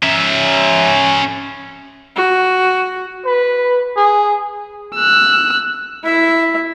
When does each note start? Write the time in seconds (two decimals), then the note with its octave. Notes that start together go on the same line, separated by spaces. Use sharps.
0.03 C#4 E5
2.16 F#4
3.25 B4
3.96 G#4
4.96 E6 F#6
6.03 E4 E5